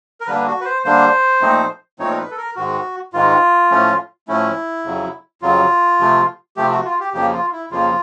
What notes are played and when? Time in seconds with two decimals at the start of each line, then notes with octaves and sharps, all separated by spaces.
0.21 A#4
0.27 D3 G3 A#3 D4 B4
0.47 F#4
0.61 B4
0.65 C5
0.84 D3 G3 A#3 D4 C5
1.41 A#2 F3 A3 C4 D#4
1.99 A#2 F3 A3 C4 D#4 C#5
2.10 A#4
2.18 B4
2.31 A4
2.37 A#4
2.56 G#2 D#3 G#3 F#4
3.13 G#2 D#3 G#3 F4
3.71 A2 F3 A3 C#4
4.28 A2 F3 A3 C#4 E4
4.84 F2 C#3 F#3
5.42 F2 C#3 F#3 F4
6.00 C3 F3 A3
6.56 C3 F3 A3 G4
6.71 F#4
6.85 F4
7.00 G4
7.13 F2 C#3 F3 A#3 G4
7.33 F4
7.52 E4
7.71 F2 C#3 F3 A#3 F4